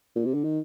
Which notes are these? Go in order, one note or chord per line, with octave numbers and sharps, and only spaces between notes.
A#2
C3
D3
D#3